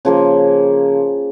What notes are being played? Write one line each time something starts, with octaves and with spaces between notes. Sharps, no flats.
C#3 F3 A#3